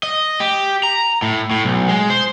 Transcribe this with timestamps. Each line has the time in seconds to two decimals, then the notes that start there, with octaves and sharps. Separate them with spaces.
0.03 D#5
0.40 G4
0.83 A#5
1.22 A2
1.51 A2
1.65 B1
1.89 G#3
2.10 C5